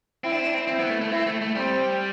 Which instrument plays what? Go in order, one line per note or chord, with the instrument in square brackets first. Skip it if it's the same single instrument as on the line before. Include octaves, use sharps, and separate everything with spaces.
[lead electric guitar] C4 [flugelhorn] E4
[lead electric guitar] D4
C4
D4
C4
[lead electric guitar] C4 [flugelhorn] E4
[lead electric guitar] B3
A3
A3
[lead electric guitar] C4 [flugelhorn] E4
[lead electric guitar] A3
A3
[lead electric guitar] G3 [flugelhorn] C4